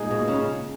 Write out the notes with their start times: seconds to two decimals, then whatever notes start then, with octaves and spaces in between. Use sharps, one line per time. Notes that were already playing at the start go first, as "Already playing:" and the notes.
Already playing: A#2 G#3 D#4 G#4
0.11 B2
0.28 C#3